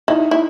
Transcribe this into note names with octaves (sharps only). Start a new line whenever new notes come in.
D#4 E4
E4